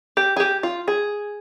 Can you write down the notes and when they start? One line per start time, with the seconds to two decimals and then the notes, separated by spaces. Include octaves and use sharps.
0.17 G4
0.36 G#4
0.40 G4
0.63 F4
0.88 G#4